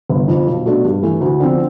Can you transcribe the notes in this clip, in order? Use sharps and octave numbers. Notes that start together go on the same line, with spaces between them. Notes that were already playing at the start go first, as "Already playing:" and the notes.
G1
F2 D3 F3
B1
B2 A3 D4
G2
E3 A3
D2
D3 F3 C4